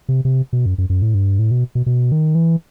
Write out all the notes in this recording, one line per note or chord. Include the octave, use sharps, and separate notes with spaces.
C3
C3
B2
F#2
F#2
F#2
A2
G2
A2
B2
B2
B2
D#3
E3